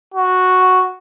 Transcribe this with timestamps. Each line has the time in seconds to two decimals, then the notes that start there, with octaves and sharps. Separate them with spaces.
0.14 F#4